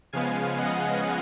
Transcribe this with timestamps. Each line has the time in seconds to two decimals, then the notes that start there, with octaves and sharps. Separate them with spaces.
0.13 C#3 F3 G#3 B3 F5 G#5
0.58 D#5 F#5